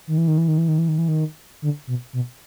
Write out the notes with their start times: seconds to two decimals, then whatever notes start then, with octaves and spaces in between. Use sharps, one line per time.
0.07 D#3
0.17 E3
0.28 D#3
0.38 E3
0.48 D#3
0.58 E3
0.68 D#3
0.78 E3
0.88 D#3
0.98 E3
1.08 D#3
1.62 D3
1.87 B2
2.13 B2